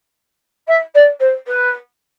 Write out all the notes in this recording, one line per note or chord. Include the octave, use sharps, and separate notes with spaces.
E5
D5
C5
B4